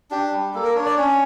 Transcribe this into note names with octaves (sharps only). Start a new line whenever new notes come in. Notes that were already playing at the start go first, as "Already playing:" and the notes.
D4 G4
G3
A#3 A4
A#4
D4 C#5
D5
C#4 C#5